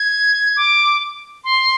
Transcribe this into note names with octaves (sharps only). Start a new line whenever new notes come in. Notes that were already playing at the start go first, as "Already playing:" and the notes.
Already playing: G#6
D6
C6